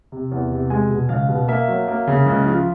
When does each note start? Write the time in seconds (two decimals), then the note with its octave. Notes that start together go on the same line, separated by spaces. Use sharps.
0.12 C3
0.32 E2
0.51 C3
0.70 G#3 G#5
0.89 B2
1.09 C#2 F5
1.29 B2
1.48 A#3 E5
1.68 F#3
1.88 A#3
2.07 C#3
2.26 C#2
2.46 F3